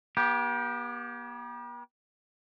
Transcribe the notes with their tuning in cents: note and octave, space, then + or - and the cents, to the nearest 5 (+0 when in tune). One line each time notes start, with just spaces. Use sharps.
B3 -45 G4 +0